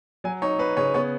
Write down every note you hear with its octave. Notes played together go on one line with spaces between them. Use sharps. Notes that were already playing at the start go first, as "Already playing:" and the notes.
F#3 G#5
D#4 C#5
D#4 B4
C#3 C#5
B3 C#5